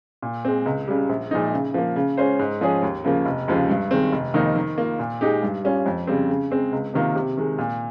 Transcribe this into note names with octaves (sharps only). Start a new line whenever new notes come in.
A#2
G#3 C4
C#2
C#3 G3
A#1
A#2 F3 G#3 D#4
C#3
F3 A#3
C#3
G#3 C#4 F4 C5
G#2
F3 G#3 C#4 G#4
D#2
C#3 F3 A#3
F1
D#2 C#3 F3 G#3
G2
D#3 G#3 C4
F1
F2 D#3 A#3 D#4
D#3
A#3 F4
A#2
G#3 D#4 G4
G2
G3 C#4 F4
F2
C#3 G3 C4
C#3
G#3 C4
C#2
C3 D#3 A#3 F4
C3
D#3 G#3
A#2